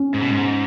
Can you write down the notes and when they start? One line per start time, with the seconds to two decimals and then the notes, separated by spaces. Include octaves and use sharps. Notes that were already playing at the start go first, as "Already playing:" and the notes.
Already playing: C#4
0.14 G#2
0.22 B2
0.29 G#2